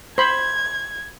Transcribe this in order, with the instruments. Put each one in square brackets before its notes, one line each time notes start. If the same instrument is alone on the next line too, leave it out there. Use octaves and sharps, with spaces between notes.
[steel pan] C5 B5 [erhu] G#6